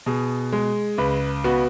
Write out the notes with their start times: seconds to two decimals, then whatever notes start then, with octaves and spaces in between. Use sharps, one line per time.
0.06 B2 G#4
0.52 G#3
0.98 C#2 B4
1.44 B3 F#4